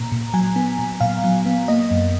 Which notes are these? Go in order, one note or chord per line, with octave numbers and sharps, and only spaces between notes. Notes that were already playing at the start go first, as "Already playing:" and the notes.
Already playing: A#2 A#5
A#2
F#3 G#5
B3
A#2
A#2 F5
F#3
B3
A#3 D#5
F#2